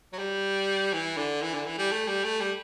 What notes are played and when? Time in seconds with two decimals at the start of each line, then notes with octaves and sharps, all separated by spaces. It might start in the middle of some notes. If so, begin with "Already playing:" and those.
0.13 F#3
0.18 G3
0.93 E3
1.17 D3
1.42 E3
1.53 D3
1.66 E3
1.78 G3
1.91 A3
2.07 G3
2.24 A3
2.40 G3